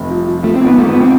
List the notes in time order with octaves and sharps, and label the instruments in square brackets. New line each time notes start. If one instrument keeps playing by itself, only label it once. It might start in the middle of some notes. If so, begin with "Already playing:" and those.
Already playing: [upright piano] F1 C3 A3
F3
F3
[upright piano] F3 [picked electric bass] A3
[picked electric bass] C4
[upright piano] G#1
[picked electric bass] B3
[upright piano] G#2 [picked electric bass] A3
[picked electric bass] B3
[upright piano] F3
[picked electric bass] C4